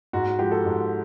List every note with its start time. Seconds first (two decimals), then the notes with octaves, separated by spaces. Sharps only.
0.13 G#2 F#4
0.26 F#4
0.39 F3 G#3 G4
0.51 A4
0.65 G#2